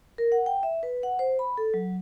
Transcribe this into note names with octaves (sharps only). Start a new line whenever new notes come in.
A#4
F#5
G5
E5
B4
F#5
C5
B5
A4
F#3